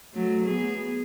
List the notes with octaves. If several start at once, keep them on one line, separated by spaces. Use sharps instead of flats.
F#3 A3
B3 G#4